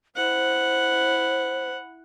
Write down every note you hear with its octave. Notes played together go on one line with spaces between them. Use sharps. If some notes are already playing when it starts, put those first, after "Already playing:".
E4 C5 F#5